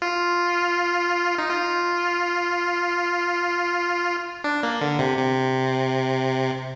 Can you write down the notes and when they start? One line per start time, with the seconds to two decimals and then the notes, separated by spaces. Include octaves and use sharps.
0.02 F4
1.38 D#4
1.50 F4
4.44 D4
4.63 A#3
4.81 D3
4.99 C3
5.18 C3